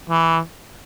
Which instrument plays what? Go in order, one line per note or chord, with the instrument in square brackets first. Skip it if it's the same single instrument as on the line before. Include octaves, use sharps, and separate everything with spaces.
[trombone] E3